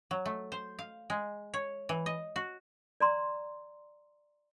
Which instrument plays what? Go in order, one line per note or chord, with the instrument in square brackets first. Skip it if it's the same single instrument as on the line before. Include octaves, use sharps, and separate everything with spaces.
[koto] F#3
A3
C5
F5
G#3
C#5
E3
D#5
F#4
[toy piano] D5 A#5 C6